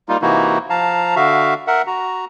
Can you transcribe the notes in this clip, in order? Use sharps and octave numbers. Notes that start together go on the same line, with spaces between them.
G3 A#3 D#4 F4
C3 E3 A#3 D#4 E4 F#4
F3 F5 A5 A#5
D3 F#4 E5 F5
A#4 E5 F#5
F#4 A#5